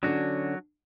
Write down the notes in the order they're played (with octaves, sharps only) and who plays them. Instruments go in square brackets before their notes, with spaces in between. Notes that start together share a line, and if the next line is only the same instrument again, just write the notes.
[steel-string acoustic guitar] D3 C#4 D4 [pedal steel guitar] F#3 F#4